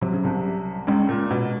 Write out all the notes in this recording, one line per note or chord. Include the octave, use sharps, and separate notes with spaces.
C3 F#3
C#3
C2 C3
C#2 C#3 G#3
A#2
B2